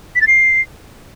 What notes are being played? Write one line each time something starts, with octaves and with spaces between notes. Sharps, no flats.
B6
A6
C7